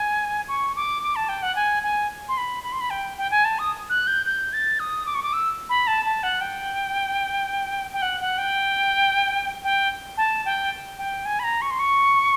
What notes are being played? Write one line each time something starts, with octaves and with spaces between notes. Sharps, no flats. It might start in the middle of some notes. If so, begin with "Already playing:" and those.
Already playing: G#5
C#6
D6
D6
A5
G5
F#5
G#5
G#5
C6
B5
B5
C6
B5
G5
G5
G#5
A5
D#6
F#6
G6
G6
A6
D#6
D6
C#6
D6
E6
B5
A5
A5
F#5
G5
G5
F#5
F#5
G5
G5
A5
G5
G5
G#5
B5
A#5
C#6
C6
C#6